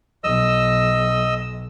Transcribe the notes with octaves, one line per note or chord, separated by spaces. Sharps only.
B1 D#5 E6